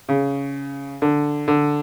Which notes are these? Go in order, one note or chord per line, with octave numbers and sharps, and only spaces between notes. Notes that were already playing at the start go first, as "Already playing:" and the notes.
C#3
D3
D3